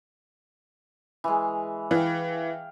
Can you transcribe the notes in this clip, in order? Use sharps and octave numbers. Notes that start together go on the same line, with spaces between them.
E3 G#3
E3 F5 G5